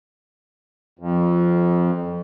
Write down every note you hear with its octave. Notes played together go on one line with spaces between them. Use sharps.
F2